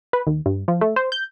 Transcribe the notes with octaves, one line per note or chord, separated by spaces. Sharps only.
B4
D#2
G2
F3
A3
C5
G6